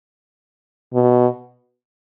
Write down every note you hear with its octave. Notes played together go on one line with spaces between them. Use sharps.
B2